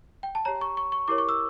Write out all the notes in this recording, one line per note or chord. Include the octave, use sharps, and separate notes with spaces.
G5
A5
G4 C#5 A#5
C#6
C#6
C#6
E4 G4 A#4 C#5 D6
C#6
E6